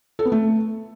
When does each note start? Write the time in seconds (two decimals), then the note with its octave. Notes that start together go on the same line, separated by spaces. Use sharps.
0.19 A4
0.25 B3
0.32 A3